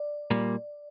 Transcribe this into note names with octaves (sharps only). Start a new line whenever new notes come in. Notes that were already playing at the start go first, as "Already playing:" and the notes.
Already playing: D5
A#2 G3 A#3